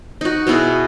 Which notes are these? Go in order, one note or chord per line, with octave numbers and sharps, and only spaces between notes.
D#4 F#4
B2 B3 E4 G#4